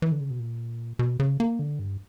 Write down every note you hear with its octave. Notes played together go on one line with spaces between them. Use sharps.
E3
D3
C#3
B2
A#2
B2
C#3
A#3
D3
G2